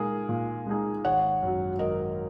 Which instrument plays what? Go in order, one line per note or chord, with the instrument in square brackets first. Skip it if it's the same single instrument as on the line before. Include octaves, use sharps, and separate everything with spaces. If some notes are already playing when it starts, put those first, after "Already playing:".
Already playing: [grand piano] A#2 G#3 D#4 G#4 [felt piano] A#4
[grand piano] A#2
G#3 D#4 G#4
[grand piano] G#1 [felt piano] C#5 F#5
[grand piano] F#2 F#3
[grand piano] G#1 [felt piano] A#4 D#5